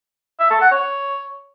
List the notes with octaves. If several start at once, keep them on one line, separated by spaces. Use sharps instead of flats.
E5
A4
F#5
C#5